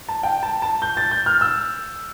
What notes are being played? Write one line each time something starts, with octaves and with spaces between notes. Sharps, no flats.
A5
G5
A5
A5
G6
A6
G6
F6
E6